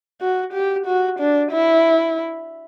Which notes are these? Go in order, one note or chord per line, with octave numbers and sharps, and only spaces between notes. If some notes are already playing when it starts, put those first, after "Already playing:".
F#4
G4
F#4
D4
E4